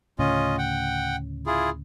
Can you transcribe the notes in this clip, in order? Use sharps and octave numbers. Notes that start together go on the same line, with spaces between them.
D2 A2 C#3 C#4 F4 D#5
F#5 G5
E4 F4 G#4